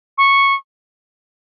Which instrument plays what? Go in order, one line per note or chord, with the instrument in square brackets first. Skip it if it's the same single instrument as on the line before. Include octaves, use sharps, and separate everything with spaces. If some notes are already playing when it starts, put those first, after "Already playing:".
[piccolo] C#6